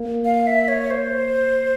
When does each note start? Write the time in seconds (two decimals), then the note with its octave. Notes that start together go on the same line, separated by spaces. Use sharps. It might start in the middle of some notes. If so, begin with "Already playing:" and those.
Already playing: A#3
0.25 F5
0.47 E5
0.68 C#5
0.90 C5